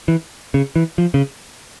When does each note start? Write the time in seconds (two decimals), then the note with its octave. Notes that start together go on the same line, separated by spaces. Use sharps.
0.08 E3
0.54 C#3
0.76 E3
0.98 F3
1.14 C#3